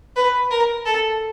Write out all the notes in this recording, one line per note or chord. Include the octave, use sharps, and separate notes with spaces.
B4
A#4
A4